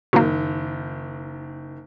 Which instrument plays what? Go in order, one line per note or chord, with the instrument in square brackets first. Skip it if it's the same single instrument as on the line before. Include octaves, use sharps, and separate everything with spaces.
[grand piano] F#1 D#3 [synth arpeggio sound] F#3 A#3